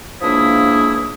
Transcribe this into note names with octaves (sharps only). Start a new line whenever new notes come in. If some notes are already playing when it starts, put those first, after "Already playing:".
C#2 F3 A#3 D4 E4 D#6